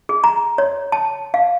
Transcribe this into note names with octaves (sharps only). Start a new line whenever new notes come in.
G#4
A#5
C#5
A5
F5